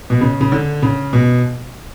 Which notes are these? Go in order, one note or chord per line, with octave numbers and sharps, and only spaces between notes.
B2
C#3
C#3
D3
C#3
B2